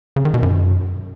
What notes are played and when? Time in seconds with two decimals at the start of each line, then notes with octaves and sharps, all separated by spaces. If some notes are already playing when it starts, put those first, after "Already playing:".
0.16 C#3
0.25 D#3
0.34 B2
0.43 F#2